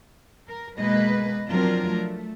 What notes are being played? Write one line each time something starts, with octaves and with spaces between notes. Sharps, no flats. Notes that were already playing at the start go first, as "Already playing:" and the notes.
A#4
B2 G#3 A#3 B4 D#5
F3 F#3 C4 D4 F4 A#4
A3